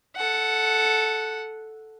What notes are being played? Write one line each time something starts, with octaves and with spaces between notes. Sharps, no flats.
A4 F#5